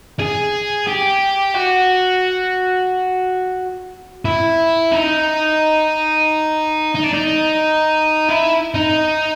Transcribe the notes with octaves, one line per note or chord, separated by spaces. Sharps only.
G#4
G4
F#4
E4
D#4
D#4
D4
D#4
E4
D#4